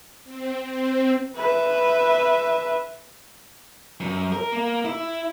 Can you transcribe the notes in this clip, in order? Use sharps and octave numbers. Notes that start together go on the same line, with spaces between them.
C4
C4
B4 E5
F#2
A#4
A#3
E4